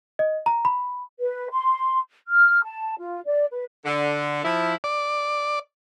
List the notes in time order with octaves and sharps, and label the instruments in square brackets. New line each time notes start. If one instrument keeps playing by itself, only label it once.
[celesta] D#5
A#5
B5
[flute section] B4
C6
F6
A5
F4
D5
B4
[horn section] D3
F3 E4
[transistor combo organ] D5